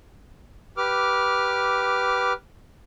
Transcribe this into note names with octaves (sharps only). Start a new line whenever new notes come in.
G4 B4 D6 F6